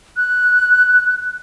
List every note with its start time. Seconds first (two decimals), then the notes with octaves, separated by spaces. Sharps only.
0.17 F#6